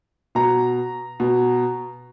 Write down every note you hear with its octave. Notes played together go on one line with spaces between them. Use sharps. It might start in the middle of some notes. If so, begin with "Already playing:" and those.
B2 A#5
B2